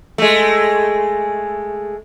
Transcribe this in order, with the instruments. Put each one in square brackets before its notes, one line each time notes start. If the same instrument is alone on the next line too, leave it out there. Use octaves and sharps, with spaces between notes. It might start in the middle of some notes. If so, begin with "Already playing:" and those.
[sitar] G#3 A3